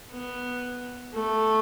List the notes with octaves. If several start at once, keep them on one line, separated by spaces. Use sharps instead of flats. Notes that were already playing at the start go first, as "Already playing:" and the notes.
B3
A3